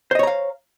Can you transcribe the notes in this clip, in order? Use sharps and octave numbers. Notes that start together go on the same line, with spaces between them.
C5 C#5 D#5 F5 A#5